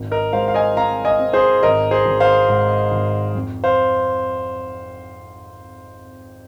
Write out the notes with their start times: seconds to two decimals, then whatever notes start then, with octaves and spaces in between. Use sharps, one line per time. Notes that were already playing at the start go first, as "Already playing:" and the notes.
Already playing: G#1
0.11 A#4 D#5
0.33 G#3 C5 F5
0.48 F5
0.54 D#5 G#5
0.76 C4 F5 A#5
1.05 D#5 G#5
1.19 C4
1.33 G#4 C5
1.63 G#1 A#4 D#5
1.91 G#4 C5
2.06 G#1
2.20 C5 F5
2.49 G#2
2.92 G#1
3.35 F2
3.64 C5 F5